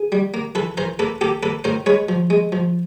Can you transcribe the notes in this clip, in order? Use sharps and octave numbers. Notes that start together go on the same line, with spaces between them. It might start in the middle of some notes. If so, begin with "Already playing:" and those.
Already playing: G#4
G3
A#3
E3 A4 B4
E3 A#4 C5
A#3 A4 B4
A#3 G4 A4
A#3 A4 B4
A2 A#4 C5
G#3 B4 C#5
F3
G#3
F3